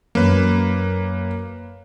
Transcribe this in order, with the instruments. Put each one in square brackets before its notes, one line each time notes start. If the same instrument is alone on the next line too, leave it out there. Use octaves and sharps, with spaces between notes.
[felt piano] F#2 [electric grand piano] A#3 B4